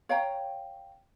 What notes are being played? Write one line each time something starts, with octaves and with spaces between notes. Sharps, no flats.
C#5 F5 G5 A#5